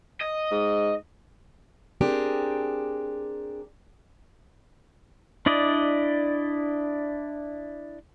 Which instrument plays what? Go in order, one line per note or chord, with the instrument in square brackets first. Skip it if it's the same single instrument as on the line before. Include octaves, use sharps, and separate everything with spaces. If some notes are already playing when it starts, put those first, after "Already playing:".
[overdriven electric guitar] D#5
[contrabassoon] G#2
[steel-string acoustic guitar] C4 D4 G4 G#4 A#4
[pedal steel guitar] D4 E4 D5 D#5